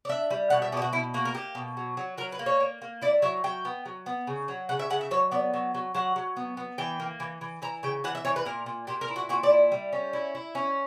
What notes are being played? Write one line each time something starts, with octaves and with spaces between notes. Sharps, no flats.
D5
D4 E5
G3
B2 F#5
E5
B2 G4 D5
F#4
B2 E4
A#3 F#4
A#4
A#3 G4
B2
F#3
F#3
F#3 A#4
B4
A#3
C#5
A#3
A#3
E4 D5
F#3 E5
F#3 G5
B3
F#3
B3
C#3
F#3
C#3 F#5
E5
C#3 F#5
E5
F#3 C#5
B3 D5
F#3
F#3
F#3 F#5
F#3
B3
B3
E3 G5
A#3
E3
E3
E3 A#5
C#3 G5
E3 F#5
E5
E3 C#5
B4
A#2 A#4
A#2
A#2 G4
A#4
E4
F#4
A#2 F#4
D5
E4
G3
C#4
E4
E4
C#4